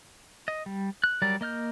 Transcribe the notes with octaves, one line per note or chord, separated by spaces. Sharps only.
D#5
G3
F#6
F#3 G3 A#4 D5
A#3 D#5 F6 G6